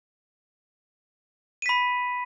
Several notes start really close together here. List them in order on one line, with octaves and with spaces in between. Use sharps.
D#7 B6 B5